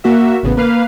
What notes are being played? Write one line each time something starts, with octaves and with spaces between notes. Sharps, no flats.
A#3 F#4 E5
A1 C#3 B3
A#3 B4 F5